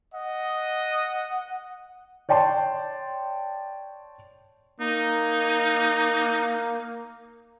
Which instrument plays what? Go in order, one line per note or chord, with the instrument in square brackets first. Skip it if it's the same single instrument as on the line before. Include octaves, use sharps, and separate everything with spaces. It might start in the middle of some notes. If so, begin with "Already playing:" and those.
[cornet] D#5 [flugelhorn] F#5
[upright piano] C#5 D5 G5 A5 C6
[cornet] A#3 [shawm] D#4